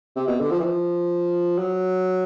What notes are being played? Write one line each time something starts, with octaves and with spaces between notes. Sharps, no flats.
C3
B2
D3
F3
E3
F3
F#3